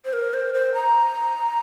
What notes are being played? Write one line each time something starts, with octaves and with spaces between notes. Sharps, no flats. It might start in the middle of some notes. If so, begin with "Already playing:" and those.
C5
A#4
C5
C5
A#5